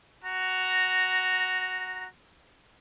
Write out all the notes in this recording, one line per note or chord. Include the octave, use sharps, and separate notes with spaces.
F#4 A#5